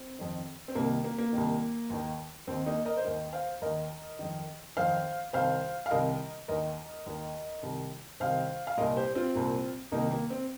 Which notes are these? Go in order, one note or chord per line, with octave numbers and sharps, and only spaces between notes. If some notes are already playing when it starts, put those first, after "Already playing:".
Already playing: C4
F2 D#3
C4
C2 C3 D#3 A#3
A#3
A#3
C2 C3 D#3
D#2 D#3
D#2 D#3 C4
A#3 D#4
A#4 D#5
C5
D#2 D#3 A#4 D#5
C5 F5
D#2 D#3 A#4 D#5
F2 D#3
F2 D#3 C5 F5
C2 C3 D#3 C5 F5
F5
C2 C3 D#3 A#4 D#5
D#2 D#3 A#4 D#5
D#2 D#3
C2 C3 D#3
C2 C3 D#3 C5 F5
F5
C2 A#2 A#4 D#5
G4 C5
C4 F4
C2 A#2
C2 C3 D#3 A#3 D#4
A#3
C4